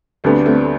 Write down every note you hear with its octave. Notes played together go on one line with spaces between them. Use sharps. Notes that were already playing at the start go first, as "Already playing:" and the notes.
D2 D3 G3 A3 B3 C4 D4
A3 C4